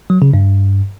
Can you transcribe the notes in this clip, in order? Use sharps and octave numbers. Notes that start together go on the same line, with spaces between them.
F#3
C#3
G2